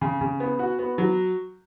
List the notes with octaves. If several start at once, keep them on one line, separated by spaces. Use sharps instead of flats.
C#3
C#3
B3
F#4
B3
F#3